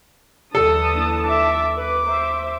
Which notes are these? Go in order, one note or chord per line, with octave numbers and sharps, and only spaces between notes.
D#2 D3 E3 F#3 A4 A5 D#6
A#3 D4 E4
E5 D6
B4 D6
C5 E5 A#5